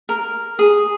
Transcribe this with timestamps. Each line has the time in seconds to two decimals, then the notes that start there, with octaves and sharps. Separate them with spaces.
0.09 A#4
0.59 G#4